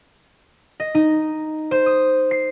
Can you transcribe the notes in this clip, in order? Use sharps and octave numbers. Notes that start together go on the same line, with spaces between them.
D#5
D#4
C5
D#6
C7